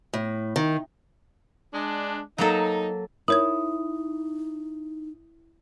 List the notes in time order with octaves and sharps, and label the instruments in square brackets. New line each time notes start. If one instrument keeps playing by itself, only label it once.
[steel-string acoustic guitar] A2
D#3
[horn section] G#3 D4
[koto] F#3 A#3 A4 [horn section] D#4
[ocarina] D#4 [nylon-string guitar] E4 [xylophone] A#4 C#5 G#6 [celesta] D#6